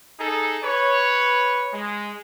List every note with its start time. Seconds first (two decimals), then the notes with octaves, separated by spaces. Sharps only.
0.19 D#4 G#4 A4
0.64 B4 C#5
1.73 G#3